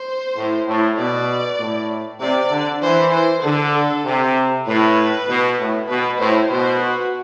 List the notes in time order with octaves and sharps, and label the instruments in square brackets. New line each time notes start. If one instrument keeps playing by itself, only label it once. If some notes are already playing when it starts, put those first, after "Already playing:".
Already playing: [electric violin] C5
[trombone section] A2
A2
[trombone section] B2 [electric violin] D5
[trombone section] A2
[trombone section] C3 [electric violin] D5
[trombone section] D3
[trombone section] E3 [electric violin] C5
[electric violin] C5
[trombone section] D3 [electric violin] A4
[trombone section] C3
[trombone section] A2 [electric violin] B4
[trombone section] B2
A2
[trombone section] B2 [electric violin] B4
[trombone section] A2 [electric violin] C5
[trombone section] B2 [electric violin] C5
[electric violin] F#4